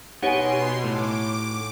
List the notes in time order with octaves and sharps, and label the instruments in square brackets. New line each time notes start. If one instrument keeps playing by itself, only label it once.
[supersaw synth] B2 C6 [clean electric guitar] B3 [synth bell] D#4 G4 C#5 [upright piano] F#5 G#5
[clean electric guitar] A2 [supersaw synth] D6